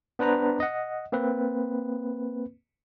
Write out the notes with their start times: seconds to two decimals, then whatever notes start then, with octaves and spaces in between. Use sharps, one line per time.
0.19 B3 D4 B4 C5 A#5
0.60 D#5 F#5
1.12 A#3 C4 B4